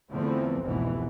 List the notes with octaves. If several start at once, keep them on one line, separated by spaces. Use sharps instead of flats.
E2 D3 E3 F3 A3 C4
F1 C2 G#2 B2 E3